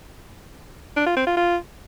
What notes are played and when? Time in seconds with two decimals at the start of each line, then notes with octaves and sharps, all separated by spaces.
0.97 D4
1.07 F4
1.17 C4
1.27 F4
1.37 F4